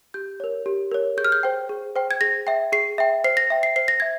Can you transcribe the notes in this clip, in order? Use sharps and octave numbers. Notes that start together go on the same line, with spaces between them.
G4 G6
A#4 C#5
G4
A#4 C#5
G#4 G6
F6
G6
C5 G5
G#4
C5 G5
G#6
G#4 A#6
E5 G5
G#4 C7
E5 G5
C5 C7
A#6
E5 G5
C7
C5 C7
A#6
E5 G#6